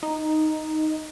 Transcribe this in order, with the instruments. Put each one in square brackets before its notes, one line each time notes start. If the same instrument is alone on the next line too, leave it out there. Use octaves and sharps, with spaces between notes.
[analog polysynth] D#4